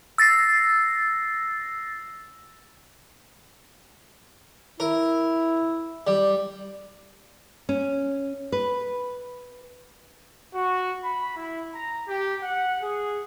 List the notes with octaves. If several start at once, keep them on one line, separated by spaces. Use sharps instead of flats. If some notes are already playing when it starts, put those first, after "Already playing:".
E6 A6 A#6 C7
E4 A#4
G3
C#4
B4
F#4
B5
E4
A#5
G4
F#5
G#4